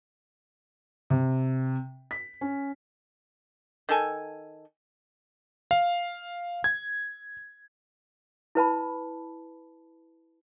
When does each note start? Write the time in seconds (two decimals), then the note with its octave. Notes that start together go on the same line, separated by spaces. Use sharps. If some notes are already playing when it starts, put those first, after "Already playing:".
1.10 C3
2.11 B6
2.41 C#4
3.89 D#3 A4 G#5
5.71 F5
6.64 G#6
8.55 E4 B4 A5 B5